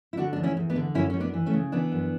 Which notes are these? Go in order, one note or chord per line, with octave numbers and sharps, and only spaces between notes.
E4
D3 D4 F#4
E2 D4
C#4 E4
E2
B3 D4
D3
F#2 C#4 E4
F#2 C#4
B3 D4
E3
A3 C#4
C#3
E3 B3 D4
F#2